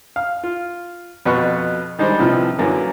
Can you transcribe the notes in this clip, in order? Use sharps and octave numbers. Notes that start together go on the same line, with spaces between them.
F5
F4
F2 B2 B4 F#5 C#6 F#6
D#3 G3 G#3 D4 D#4 C5
A2 C3 E3 F3
F#2 D3 E3 A#3 C#4